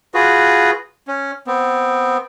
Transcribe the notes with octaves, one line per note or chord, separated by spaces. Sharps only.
F4 F#4 G#4 B4
C#4
B3 C4